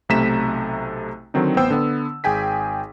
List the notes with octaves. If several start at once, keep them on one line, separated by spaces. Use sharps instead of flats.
B1 C3 A3 A#5 B6 E7
D3 D#3 F#3 C4 D#4
A1 B3 C5 G5 E6
D3 B3
G#1 G#4 G5 G#5 B6